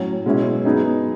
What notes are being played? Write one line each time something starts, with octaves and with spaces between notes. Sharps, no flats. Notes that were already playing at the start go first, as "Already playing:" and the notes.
Already playing: A2 F#3 C#4
B2 G#3 C#4 E4
F#3 B3 D#4 G#4